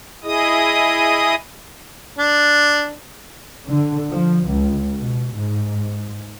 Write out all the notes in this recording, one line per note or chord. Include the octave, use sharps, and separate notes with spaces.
E4 G#4 D#5 D#6
D4
D3
F3
C#2
B2
G#2